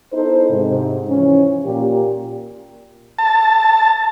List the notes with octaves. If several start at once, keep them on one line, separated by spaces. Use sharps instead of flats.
B3 D#4 E4 A4 C5
G#2 C3
G#2 E3 F3 C#4
A#2 G4
A5